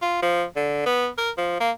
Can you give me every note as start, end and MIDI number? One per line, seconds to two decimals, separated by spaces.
0.02 0.22 65
0.22 0.44 53
0.56 0.83 50
0.86 1.08 59
1.18 1.31 70
1.38 1.57 53
1.60 1.71 58